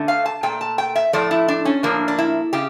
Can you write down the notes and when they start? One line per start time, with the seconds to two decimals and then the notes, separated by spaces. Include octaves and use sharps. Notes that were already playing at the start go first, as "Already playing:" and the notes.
Already playing: D3 A3
0.08 F5
0.26 A5
0.43 A#2 A3 G5
0.61 A5
0.78 G5
0.95 E5
1.13 A2 F3 A3 D5
1.31 E4
1.48 D4
1.65 C#4
1.83 A2 F3 A#3 D4
2.08 D4
2.18 E4
2.53 C#3 G4